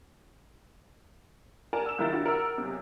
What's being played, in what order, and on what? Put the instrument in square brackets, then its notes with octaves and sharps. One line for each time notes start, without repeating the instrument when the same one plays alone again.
[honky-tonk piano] A#4 D5 F#5 G#5 A5
E6 E7
C#2 D#3 E4 A#4 G5 A6
D4 E4 F#4 G4
A#4 F#5 E6
B1 C3